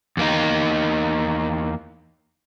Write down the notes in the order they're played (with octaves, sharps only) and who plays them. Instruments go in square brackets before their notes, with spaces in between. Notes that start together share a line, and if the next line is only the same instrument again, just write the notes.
[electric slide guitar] E2 A#3 D#4